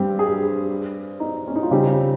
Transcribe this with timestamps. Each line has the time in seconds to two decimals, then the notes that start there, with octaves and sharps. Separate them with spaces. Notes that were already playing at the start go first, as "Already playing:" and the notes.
Already playing: G2 G3 C4 G4
0.19 G#4
1.20 D#4
1.47 C#4
1.56 D#4
1.63 F4
1.71 C#3 G3 C4 D#4 G4